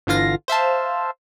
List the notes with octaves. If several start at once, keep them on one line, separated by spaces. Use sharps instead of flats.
G1 D3 E3 F4 F5 A#6
C5 E5 F5 A5